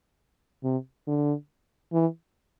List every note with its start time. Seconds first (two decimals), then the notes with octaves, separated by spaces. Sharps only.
0.64 C3
1.07 D3
1.93 E3